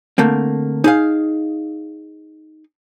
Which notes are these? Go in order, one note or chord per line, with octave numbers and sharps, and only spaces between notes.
D3 A3 A#3 C4
D#4 G#4 F5